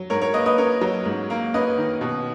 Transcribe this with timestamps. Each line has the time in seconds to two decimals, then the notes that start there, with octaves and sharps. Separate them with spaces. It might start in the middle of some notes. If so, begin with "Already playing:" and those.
Already playing: F#3
0.10 G#2 A#4 C#5
0.22 A#4 C#5
0.33 A#3 B4 D#5
0.46 B4 D#5
0.58 C#4 A#4 C#5
0.81 F#3
1.05 G#2
1.30 A#3
1.54 C#4 B4 D#5
1.78 D#3
2.01 B2